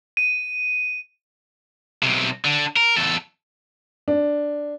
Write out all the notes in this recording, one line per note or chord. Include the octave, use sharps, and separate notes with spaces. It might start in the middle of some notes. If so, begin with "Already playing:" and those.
D#7
B1 C3
D3
A#4
E2 A4
D4